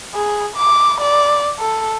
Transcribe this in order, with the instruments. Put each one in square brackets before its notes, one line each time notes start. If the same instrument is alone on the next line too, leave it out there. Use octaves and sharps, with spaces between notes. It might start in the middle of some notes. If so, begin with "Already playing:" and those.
[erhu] G#4
D6
D5
A4